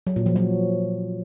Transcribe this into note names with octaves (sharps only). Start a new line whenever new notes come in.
F#3
A#2
F3
F#3